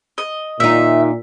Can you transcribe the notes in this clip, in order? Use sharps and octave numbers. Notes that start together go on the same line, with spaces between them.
D#5
A#2 D#3 D#4 E5